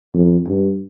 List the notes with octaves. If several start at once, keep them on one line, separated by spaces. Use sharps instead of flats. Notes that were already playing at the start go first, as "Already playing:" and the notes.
F2
G2